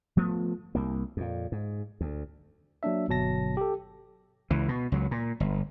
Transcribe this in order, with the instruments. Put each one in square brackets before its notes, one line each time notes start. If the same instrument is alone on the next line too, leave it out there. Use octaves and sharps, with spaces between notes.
[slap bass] F3 A3 B3
C2 A#3
F2 A#2
G#2
D2
[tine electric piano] F#3 A#3 D4 E5
G1 B2 F#3 A5 A#6
G4 A4
[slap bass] C#2 E3
B2
C#2 F#3
A#2
G1